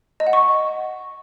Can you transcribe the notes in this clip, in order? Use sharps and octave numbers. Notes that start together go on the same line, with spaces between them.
D#5
F#5
C#6